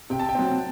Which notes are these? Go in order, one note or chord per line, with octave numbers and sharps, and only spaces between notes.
C3 G5
A5
G5
F#3 C4